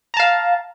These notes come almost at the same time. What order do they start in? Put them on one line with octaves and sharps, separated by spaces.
A#5 A5 F5